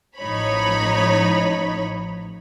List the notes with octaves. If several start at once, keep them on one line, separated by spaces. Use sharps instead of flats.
A1 A2 F3 D#4 C#5 B5